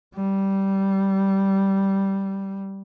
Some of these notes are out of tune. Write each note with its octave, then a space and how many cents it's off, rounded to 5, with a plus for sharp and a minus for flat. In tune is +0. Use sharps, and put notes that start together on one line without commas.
G3 -10